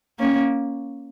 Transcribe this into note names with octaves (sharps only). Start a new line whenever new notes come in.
A#3 C#4